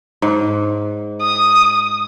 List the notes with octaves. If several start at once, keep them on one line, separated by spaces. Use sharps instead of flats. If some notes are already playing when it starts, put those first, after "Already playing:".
G#2
D#6